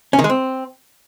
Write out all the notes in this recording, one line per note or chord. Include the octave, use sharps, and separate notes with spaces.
C#4
D#3
G#3
C4